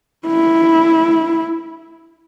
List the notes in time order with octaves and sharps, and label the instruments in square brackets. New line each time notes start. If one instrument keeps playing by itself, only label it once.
[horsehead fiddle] E4